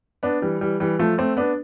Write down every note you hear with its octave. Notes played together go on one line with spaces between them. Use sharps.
B3 D4
E3 G3
E3 G3
E3 G3
F3 A3
A3 C4
B3 D4